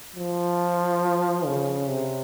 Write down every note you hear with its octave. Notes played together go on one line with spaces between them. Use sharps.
F3
C#3
C3